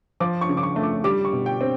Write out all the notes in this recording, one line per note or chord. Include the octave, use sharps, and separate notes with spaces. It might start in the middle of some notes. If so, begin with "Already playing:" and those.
F3 D6
C#6
C#3
D6
C#6
A3
D6
G3 D6
C#6
B2
G5
C4